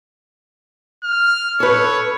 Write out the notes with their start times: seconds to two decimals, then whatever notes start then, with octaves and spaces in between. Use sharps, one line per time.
1.04 F6
1.60 A4 B4 C#5